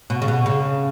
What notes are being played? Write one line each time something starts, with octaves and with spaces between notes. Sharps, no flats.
B2
C#3
B2
C#3